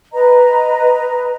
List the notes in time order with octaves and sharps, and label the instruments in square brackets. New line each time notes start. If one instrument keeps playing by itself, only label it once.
[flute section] B4 D#5 A#5